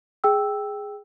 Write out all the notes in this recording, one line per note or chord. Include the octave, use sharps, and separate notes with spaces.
G#4 G5 E6